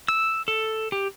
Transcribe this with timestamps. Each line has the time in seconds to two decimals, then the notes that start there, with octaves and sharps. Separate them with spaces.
0.08 E6
0.48 A4
0.92 G4